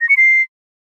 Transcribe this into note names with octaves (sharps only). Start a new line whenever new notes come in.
A#6
C#7
C7